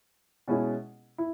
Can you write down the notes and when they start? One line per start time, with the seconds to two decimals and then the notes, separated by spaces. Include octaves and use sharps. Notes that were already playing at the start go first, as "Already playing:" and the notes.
0.48 B2 G#3 C#4 E4 G#4
1.18 E4